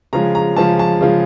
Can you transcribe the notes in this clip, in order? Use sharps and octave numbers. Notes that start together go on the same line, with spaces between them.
C#3 F3 G#3 A#5
A#5
C#3 F3 G#3 A5
A5
C#3 F3 G#3